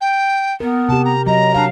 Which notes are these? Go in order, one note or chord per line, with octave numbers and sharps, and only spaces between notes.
G5
B3 A#4
C3 G4 A5
A#5
F#3 D#5 A#5
D4 F5